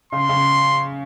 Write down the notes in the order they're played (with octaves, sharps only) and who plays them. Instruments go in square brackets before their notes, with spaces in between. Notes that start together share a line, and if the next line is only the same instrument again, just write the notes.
[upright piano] C#3 [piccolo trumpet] C6
[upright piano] C#3